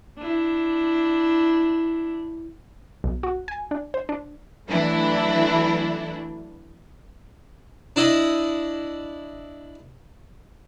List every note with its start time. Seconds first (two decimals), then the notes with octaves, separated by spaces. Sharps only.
0.18 D4 E4
3.04 B1
3.23 F#4
3.48 G#5
3.71 D4
3.94 C5
4.09 D4
4.67 E3 F#3 A3 D4 E4
7.96 D4 E4 D#5